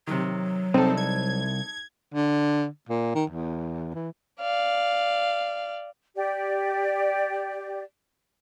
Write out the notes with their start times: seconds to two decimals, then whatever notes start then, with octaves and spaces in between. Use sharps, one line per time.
0.07 C3 D#3 F#3
0.74 C2 C4 D#4 A4
0.97 G#6
2.14 D3
2.89 A#2
3.15 D#3
3.30 E2
3.95 E3
4.41 D5 F5
6.15 G4 D5